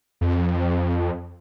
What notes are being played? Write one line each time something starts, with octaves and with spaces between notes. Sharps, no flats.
F2